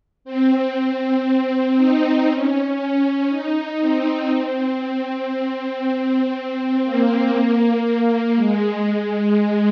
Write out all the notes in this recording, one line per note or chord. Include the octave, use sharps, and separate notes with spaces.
C4
C4
D#4
C#4
C#4
D#4
C4
C4
C4
A#3
A#3
G#3
G#3
G#3